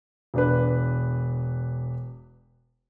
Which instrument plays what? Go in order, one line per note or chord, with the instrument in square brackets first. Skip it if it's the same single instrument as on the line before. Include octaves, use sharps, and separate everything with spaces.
[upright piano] E1 D4 B4